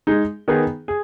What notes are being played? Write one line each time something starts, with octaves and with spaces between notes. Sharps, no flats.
G#3 D#4 G#4
D#3 B3 D#4 G#4
G#4